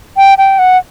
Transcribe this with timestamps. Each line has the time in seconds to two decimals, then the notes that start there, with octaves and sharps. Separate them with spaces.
0.17 G5
0.38 G5
0.59 F#5